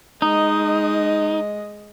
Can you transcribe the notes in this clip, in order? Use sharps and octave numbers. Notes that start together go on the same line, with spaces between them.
G#3 D#4 D#5